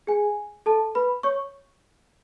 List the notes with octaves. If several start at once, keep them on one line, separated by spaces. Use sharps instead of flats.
G#4 G#5
A4 A5
B4 B5
C#5 C#6